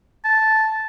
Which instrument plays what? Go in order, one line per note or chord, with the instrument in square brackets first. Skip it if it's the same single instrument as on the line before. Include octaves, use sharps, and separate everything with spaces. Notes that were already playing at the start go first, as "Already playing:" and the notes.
[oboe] A5